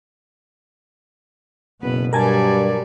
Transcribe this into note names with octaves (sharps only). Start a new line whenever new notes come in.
F#1 B2 B3 B4
G2 F#3 G3 A#4 D5 G#5 A5